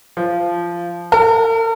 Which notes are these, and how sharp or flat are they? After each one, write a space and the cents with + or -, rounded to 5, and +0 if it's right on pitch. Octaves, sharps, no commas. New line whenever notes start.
F3 -15
A#4 -45